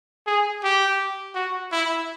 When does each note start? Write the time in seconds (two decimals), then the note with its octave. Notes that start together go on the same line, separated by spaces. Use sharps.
0.27 G#4
0.64 G4
1.35 F#4
1.72 E4